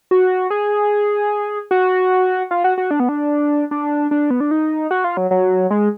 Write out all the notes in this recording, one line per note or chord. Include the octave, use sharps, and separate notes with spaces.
F#4
G#4
F#4
F4
F#4
F#4
D4
B3
D4
D4
D4
B3
D4
D#4
F#4
F4
F#3
F#3
G#3